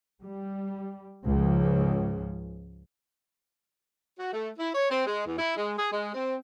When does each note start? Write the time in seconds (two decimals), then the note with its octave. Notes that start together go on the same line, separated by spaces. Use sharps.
0.23 G3
1.26 C#2 G#2 C#3 F3
4.19 F#4
4.33 A3
4.59 E4
4.75 C#5
4.90 C4
5.06 G#3
5.27 E2
5.38 E4
5.56 G#3
5.78 G#4
5.92 G#3
6.14 C4